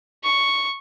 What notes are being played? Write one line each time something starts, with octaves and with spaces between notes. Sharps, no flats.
C#6